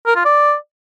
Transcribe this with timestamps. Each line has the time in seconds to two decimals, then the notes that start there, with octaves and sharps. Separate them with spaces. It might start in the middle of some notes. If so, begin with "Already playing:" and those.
0.06 A#4
0.16 F4
0.25 D5